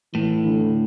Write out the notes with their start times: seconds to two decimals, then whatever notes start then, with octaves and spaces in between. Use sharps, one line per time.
0.14 A2 E3
0.45 D3